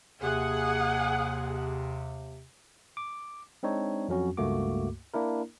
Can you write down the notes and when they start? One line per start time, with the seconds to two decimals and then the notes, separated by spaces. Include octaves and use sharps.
0.22 D#2 C3 G#4 F#5
2.97 D6
3.63 G#3 C4 D4 D#4 C#5
4.09 F2 F#3 C#4 F#4
4.37 C#2 G2 A3 A#3 F#4 D6
5.14 A#3 D4 E4 A#4